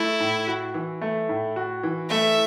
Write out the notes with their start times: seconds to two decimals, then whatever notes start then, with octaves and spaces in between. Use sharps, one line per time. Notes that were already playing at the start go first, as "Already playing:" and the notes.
Already playing: A3 E4
0.20 A2
0.47 F#4
0.74 E3
1.01 A3
1.29 A2
1.56 F#4
1.83 E3
2.10 A3 E5